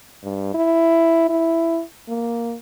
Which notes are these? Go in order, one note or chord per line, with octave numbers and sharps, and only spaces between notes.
G2
E4
E4
A#3